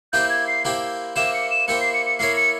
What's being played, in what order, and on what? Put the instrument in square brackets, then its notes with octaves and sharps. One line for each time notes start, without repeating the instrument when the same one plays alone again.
[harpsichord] A#3 E4 G4 C5 [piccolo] G6
[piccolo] G#6
C7
[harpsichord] A#3 E4 G4 C5
[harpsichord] A#3 E4 G4 C5 [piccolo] E7
[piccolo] C#7
E7
[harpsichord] A#3 E4 G4 C5 [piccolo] C#7
[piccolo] C7
C#7
C#7
[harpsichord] A#3 E4 A#4 C#5 [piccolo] C7
[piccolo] C#7